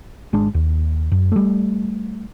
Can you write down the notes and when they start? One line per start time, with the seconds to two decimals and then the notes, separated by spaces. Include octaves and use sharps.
0.33 G#1 G#3 D4
0.54 D#2
1.12 F#2
1.32 G3 A3